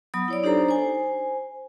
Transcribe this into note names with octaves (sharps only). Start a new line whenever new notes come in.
F#3 B3 B5 D#6
E4 C#5 D5
D4 D#4 G4 A4 C5 A#5
C5 G#5